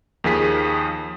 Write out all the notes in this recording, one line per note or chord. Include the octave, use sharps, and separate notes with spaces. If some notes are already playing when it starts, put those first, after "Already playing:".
D#2 D#3 F3 G#4 B6